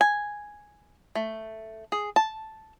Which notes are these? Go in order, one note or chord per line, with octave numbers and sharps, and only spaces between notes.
G#5
A3
G#4
A5